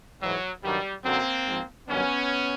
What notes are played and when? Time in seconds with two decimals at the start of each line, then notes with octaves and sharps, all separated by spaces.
0.21 G#2 E3 F#3
0.63 G2 D#3 F#3 G3
1.04 F#2 D3 F#3 A#3 C4
1.46 G#2 F3
1.87 G2 D#3 F#3 B3 C#4